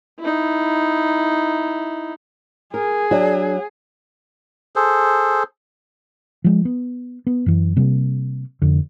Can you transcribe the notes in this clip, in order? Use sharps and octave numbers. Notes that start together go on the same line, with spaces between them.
D#4 E4
G#4 A#4
F#3 D4
G#4 A4 C5
F3 G#3
B3
B3
F#2 E3
C3 G3 A#3
F1 F2 D3